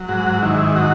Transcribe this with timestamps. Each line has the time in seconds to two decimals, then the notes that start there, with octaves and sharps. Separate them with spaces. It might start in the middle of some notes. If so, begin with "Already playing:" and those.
Already playing: F#3
0.09 G#2 F#4
0.42 D#3 E4
0.76 F#3 F#4